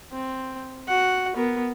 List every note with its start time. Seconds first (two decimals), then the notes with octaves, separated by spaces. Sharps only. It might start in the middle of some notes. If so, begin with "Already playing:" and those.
0.12 C4
0.88 F#4 F#5
1.35 B3 A#4